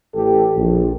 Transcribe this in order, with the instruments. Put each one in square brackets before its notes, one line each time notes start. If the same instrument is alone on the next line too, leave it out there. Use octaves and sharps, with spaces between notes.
[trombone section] A1 G4 A4
A#1